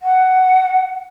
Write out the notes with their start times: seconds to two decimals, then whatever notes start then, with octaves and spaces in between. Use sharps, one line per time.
0.02 F#5